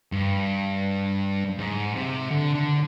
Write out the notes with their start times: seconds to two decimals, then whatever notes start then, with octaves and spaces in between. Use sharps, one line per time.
0.12 G2
1.58 G#2
1.95 C3
2.31 D3
2.55 D3